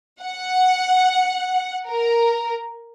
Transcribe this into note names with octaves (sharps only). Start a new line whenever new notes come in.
F#5
A#4